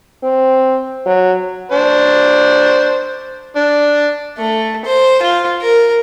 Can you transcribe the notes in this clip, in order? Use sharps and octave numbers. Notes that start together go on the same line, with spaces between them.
C4
F#3
D4 C5
D4
A3
C5
F4
A#4